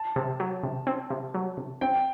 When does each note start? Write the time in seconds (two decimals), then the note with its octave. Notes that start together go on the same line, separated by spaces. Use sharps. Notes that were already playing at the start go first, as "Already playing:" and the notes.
Already playing: A5
0.16 C3
0.40 F#3
0.63 C3
0.87 C4
1.10 C3
1.34 F#3
1.57 C3
1.81 C4 G5